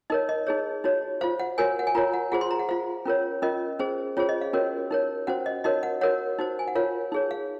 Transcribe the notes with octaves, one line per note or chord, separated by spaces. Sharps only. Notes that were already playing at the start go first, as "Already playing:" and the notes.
D#4 A#4 C#5 D#5
D#5
D#4 G#4 C#5
D#4 F#4 C#5
F4 C5 F5
F#5
F#4 A#4 C#5 G#5
F#5
G#5
F4 A#4 C#5 A#5
F#5
F4 G#4 C5 F#5
C6
A#5
F#5
F4 C5 F5
C#4 F4 A#4 C#5
C#4 F4 A#4 D#5
C#4 G#4 C5
C#4 F4 G#4 C5 C#5
D#5
F5
C#4 F#4 A#4 C#5
D#4 A#4 C#5
C#4 F#4 C5 F#5
D#5
D#4 F#4 A#4 C#5 D#5
F#5
F#4 A#4 C#5 F#5
D#4 F#4 C5
G#5
F#5
F4 A#4 C#5 F5
D#4 G#4 C#5
F5